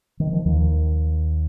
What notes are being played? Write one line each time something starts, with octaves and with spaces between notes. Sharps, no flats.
D#3
F3
D#2 D#3